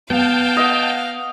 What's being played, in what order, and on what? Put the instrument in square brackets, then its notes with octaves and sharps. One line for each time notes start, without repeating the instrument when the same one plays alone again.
[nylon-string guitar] B3 [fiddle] F5 [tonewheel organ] G5 A5 G6
[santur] D#5 F#5